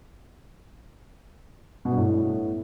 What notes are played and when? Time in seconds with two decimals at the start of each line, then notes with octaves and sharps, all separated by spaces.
1.85 B2
1.91 G2
1.98 A2